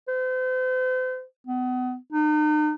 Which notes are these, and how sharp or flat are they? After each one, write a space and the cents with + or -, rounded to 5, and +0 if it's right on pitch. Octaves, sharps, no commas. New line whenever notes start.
C5 -40
B3 +30
D#4 -40